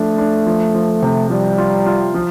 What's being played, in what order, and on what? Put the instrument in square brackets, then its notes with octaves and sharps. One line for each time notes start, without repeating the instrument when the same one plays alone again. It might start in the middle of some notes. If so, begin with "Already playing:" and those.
Already playing: [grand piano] F3 D4 [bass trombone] A3
[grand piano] D4
F3
F3
C3
[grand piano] F3 [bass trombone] G3
[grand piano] F4
F4
F3